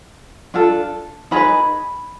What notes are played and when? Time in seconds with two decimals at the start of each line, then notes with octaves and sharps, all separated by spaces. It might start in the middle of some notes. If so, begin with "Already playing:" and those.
0.54 D4 F4 A4
1.31 D#4 G#4 B4 B5